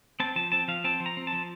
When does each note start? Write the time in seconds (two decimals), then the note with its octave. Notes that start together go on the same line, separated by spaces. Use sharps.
0.20 C4 A5
0.36 F3 A5
0.52 C4 A5
0.68 F3 F5
0.84 C4 A5
1.00 F3
1.06 A#5
1.17 C4
1.27 A5
1.32 F3